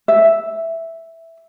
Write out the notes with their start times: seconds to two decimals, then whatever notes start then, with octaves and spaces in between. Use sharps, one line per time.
0.08 E5